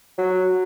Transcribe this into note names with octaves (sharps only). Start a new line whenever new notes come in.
F#3